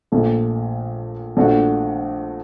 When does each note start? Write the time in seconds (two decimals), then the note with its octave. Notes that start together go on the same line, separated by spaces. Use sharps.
0.12 A#1 A#2 A3
1.37 A#1 A#2 A3 D4 F#4